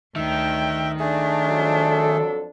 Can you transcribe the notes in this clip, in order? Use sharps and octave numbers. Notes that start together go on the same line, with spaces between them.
D2 D#3 E5 G5
A3 D4 G#4
F2 F#3 A4